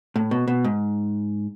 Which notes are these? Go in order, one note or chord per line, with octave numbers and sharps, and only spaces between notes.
A2
B2
B2
G#2